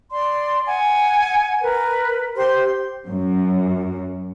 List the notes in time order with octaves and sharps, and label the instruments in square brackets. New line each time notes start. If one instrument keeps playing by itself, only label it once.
[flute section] D5 C6
F#5 G#5
A#4 B4
G4 C5 C6
[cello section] F#2